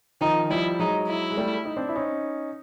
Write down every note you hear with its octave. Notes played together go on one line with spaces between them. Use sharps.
D#3 F3 D#4
F3 G3 E4
F#3 G#3 D#4
E4
G#3
G3 A3
D#4
C4 D4
E4
C#4 D#4